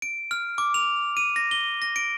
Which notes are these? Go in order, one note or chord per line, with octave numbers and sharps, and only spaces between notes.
D7
F6
D6
F7
D#7
A#6
G7
A#6
D7